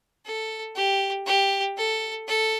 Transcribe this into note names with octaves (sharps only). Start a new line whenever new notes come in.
A4
G4
G4
A4
A4